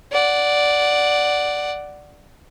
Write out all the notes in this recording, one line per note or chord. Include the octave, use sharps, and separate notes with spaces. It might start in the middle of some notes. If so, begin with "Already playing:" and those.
D5 F#5